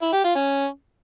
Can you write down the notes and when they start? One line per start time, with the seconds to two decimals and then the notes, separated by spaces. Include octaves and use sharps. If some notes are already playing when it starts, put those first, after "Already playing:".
0.02 E4
0.13 G4
0.24 F4
0.35 C#4